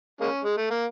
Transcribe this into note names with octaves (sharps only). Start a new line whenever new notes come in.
G#3 A#3 C#4
G#3
A3
A#3